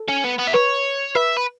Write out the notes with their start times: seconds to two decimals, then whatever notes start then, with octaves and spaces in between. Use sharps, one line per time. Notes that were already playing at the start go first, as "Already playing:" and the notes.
Already playing: A4
0.09 C#4
0.24 B3
0.39 B3
0.48 E5
0.54 B4 C#5
1.15 B4 E5
1.37 B4